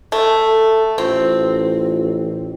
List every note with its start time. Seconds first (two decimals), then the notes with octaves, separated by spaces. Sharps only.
0.12 A3 A4
0.98 A1 C4 F4